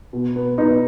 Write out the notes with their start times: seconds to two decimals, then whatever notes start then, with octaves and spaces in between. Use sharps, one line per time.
0.13 B2
0.36 B3
0.58 B2 B3 D#4